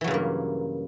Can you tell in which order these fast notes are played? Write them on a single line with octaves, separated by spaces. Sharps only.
E3 F#3 C#3 G2 A#3